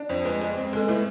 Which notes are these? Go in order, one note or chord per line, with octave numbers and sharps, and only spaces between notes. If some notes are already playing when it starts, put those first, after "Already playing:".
Already playing: D4
F2 C5
G#3 B4
G#3
C4
G#3 A4
A2 B4